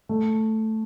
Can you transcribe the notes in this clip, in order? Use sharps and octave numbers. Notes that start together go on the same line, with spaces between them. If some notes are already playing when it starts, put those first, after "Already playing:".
A3